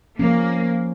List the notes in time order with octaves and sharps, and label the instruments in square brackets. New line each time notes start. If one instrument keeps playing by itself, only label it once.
[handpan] F3 C#4 [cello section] A#3